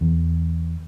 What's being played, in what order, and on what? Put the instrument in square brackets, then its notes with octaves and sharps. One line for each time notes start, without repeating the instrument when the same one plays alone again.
[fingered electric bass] E2